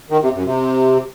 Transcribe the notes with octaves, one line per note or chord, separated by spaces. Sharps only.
D#3
C3
F#2
C3